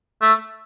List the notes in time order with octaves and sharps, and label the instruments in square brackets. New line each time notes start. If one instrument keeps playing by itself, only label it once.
[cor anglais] A3